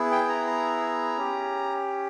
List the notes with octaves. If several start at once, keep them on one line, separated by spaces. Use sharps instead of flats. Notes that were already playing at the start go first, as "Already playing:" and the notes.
Already playing: B3 E4 G#4
G5
A#5
A#5
C#4 G4